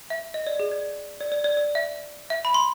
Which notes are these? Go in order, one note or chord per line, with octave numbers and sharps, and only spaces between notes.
E5
D#5
D5
G#4
D5
D5
D5
D5
D5
E5
E5
B5
C6